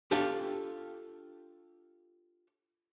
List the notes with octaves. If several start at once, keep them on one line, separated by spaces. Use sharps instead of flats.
D4 F4 G4 A4 F5 A5